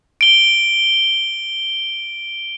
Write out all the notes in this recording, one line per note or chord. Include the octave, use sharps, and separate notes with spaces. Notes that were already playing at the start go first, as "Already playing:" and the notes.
D7 G7